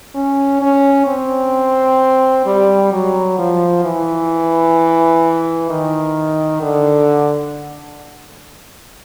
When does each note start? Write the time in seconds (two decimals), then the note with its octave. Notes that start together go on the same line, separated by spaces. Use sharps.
0.15 C#4
0.62 C#4
1.07 C4
2.46 G3
2.93 F#3
3.39 F3
3.84 E3
5.70 D#3
6.61 D3